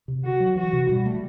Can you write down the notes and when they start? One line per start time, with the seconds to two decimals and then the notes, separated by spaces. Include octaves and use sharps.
0.08 C3
0.24 D3 F#4
0.40 F#3
0.56 E3 F#4
0.73 C3
0.89 B2 G3
1.06 A3